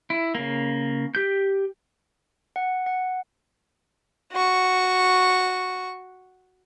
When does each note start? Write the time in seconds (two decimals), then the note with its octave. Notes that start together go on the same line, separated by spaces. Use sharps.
0.10 E4
0.35 C#3 A#3
1.15 G4 G6
2.56 F#5
2.86 F#5
4.32 F#4 C#6